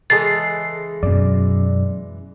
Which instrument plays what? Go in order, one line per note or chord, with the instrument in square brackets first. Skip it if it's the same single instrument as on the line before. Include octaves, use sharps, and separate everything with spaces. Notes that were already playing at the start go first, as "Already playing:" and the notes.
[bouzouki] C#3 E3 G#3 [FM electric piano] G#4 A4 C7 [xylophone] A6
[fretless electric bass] F#2 [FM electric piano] B2 D5